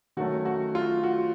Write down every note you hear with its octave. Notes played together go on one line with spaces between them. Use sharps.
D#3 F#3 A3 C#4 F#4
F#4
F4
F#4